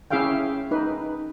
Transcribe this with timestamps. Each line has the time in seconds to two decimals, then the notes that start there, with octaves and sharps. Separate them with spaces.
0.11 C#4 E4 G#4 E5 F5 G5
0.71 D#4 B4